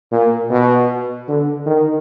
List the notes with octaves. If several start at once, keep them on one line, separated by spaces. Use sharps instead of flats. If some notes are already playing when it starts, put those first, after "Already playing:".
A#2
B2
D3
D#3